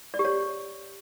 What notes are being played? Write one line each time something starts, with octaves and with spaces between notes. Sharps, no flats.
D5
G4
C#5